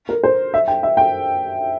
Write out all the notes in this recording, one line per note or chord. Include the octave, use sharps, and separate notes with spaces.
A#4
C5
E5
G5
E5
G5